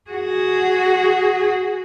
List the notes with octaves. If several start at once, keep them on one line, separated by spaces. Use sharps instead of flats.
F#4 G#4